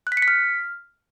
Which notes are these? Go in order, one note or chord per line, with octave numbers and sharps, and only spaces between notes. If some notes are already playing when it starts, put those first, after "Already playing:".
F#6
B6
C#7
B6
F6